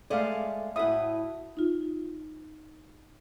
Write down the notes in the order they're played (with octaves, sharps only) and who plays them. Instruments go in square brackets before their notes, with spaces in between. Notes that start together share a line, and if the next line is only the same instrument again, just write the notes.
[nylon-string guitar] G#3 A3 D#5 [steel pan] D5 F5
[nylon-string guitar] A2 F#4 [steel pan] E5 D#6
[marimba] D#4 F4